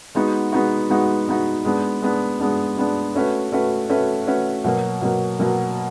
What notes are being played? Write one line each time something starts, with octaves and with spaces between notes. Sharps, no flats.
G#3 B3 D#4 F#4
G#3 B3 D#4 F#4
G#3 B3 D#4 F#4
G#3 B3 D#4 F#4
G#3 B3 D4
G#3 B3 D4
G#3 B3 D4
G#3 B3 D4
A3 C#4 F#4 B4
A3 C#4 F#4 B4
A3 C#4 F#4 B4
A3 C#4 F#4 B4
B2 F#3 A#3
B2 F#3 A#3
B2 F#3 A#3